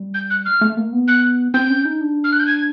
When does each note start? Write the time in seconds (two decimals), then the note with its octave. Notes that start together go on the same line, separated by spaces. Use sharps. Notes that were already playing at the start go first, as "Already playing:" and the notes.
Already playing: G3
0.14 G6
0.30 F#6
0.45 F6
0.61 A3
0.77 A#3
0.93 B3
1.08 F#6
1.54 C4 G6
1.70 C#4
1.85 D#4
2.01 D4
2.24 F6
2.32 F#6
2.39 G6
2.47 G#6